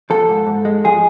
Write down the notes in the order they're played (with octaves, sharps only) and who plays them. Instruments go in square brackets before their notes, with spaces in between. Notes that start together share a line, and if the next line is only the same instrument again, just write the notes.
[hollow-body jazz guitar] F3 A4
G#2
G#2
G#3
F3 G#4